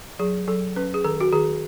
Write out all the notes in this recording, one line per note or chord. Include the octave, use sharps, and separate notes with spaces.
F#3 G#4
F#3 A4
C#4 B4
G#4
D#3 A4
F#4
D#3 G#4